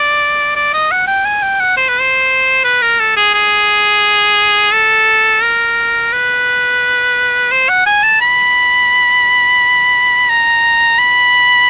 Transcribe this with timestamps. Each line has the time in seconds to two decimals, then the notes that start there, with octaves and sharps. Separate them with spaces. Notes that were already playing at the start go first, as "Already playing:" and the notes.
Already playing: D5
0.56 D5
0.74 D#5
0.91 F#5
1.07 G5
1.25 G#5
1.43 G5
1.60 F#5
1.77 C5
1.89 B4
2.00 C5
2.64 B4
2.82 A#4
2.99 A4
3.16 G#4
3.34 G#4
4.73 A4
5.42 A#4
6.13 B4
7.51 C5
7.69 F#5
7.86 G#5
8.03 A5
8.21 B5
10.29 A#5
10.98 B5